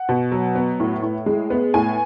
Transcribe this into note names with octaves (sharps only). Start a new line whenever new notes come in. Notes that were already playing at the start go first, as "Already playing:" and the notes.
Already playing: F#5
B2
F#3
B3
A2
A2
G#3
B3
A2 G#5